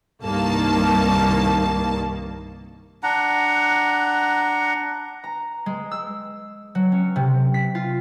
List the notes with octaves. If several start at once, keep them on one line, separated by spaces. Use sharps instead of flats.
C2 G2 D#3 A#3 A5
D4 F#5 A#5
A#5
G#3
E6
F#3
C#4
C3
B6
F4